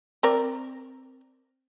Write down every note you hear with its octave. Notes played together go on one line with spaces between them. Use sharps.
C4 A#4 D5